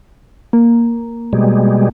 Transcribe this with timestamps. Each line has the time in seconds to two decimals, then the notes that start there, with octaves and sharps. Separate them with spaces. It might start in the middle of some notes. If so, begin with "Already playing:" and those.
0.53 A#3
1.33 B2 G3 G#3